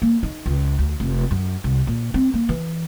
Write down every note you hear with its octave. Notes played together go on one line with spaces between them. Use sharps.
A#3
D#4
C#2
D2
F1
F#2
C2
A#2
C4
A#3
E3